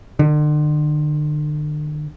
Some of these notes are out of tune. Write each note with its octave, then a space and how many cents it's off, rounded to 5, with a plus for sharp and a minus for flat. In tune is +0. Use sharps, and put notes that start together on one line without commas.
D3 +40